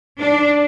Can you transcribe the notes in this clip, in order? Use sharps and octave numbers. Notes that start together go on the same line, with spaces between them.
D4